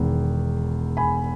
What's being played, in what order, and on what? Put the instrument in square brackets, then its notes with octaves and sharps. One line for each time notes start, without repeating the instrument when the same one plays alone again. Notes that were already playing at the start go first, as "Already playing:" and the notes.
Already playing: [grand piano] E1 E2 D#3
G#5 B5